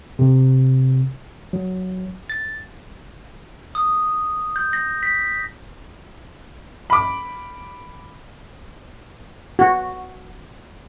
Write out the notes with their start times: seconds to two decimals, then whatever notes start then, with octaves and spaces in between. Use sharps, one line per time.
0.19 C3
1.53 F#3
2.30 A6
3.75 D#6
4.56 G6
4.73 A#6
5.03 B6
6.90 B5 D6
9.59 F#4